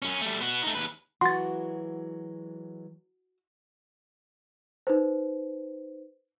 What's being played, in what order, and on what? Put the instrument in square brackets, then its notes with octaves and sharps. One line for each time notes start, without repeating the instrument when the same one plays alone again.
[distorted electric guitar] F#2 C#4
G3 A3
B3 F#4
A3 D#4
D#2 B4
[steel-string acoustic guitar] E3 F#3 G#3 [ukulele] F#4 [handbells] C6 A6
[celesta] D#4 B4 C5